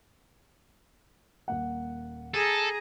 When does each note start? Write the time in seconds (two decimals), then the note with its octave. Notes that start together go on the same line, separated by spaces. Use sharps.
1.48 D#1 A#3 F#5
2.34 G#4 A4 A#5